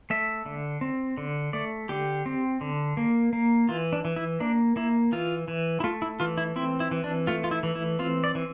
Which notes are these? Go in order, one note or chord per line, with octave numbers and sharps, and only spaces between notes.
A3 E5
D3
C4
D3
A3 D5
D3 G4
C4
D3
A#3
A#3
E3 F4
D4
E3
E4
A#3 D4
A#3 E4
E3 F4
E3
E4
A3 F4
E4
E3 F4
E4
C4 E4
E4
E3
D4
A3 F4
F4
E4
E3
E4
C4 F4
D5
E3